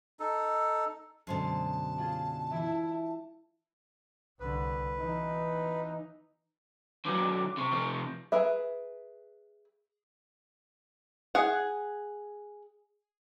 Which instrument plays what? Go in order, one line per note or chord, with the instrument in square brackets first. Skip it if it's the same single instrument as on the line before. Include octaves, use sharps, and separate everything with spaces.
[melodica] D#4 A4
[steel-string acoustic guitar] F#2 B2 D3 [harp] G#3 C5 C7 [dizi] A5
[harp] D4 F4 G#4
[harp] E3 [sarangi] E4
[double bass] C2 D3 [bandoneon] B4
[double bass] E3 [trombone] D#4
[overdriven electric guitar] D#3 F#3 [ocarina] D6
[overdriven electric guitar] C3 [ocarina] C#6
[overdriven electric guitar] C3 F3
[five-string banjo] G#4 A#4 B4 E5
G#4 F#5